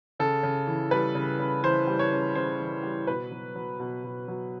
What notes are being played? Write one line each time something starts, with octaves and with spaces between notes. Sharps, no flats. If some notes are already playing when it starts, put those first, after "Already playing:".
C#3 A4
C#3
E3
G3 B4
C#3
C#3
E3 C5
G3
C#5
C#3
C#3 C5
E3
G3
B2 B4
F#3
F#3
B2
B2
F#3